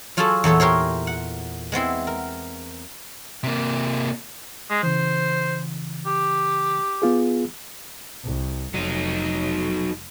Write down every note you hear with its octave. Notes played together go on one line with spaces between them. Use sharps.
F#3 F4 F#4 G#4 A4 A5
E2 A#2 A4 C#5
G4 A#4 C5 C#5
F#5
G#3 B3 C4 E4
A#4
C3 A#3
G#3
C#3 E3 C5
G4
B3 F4 G#4
C2
F1 F#3 D#4